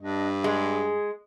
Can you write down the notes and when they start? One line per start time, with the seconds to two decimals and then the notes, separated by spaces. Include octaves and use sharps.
0.02 G2 D4 D#5
0.44 G#3 G#4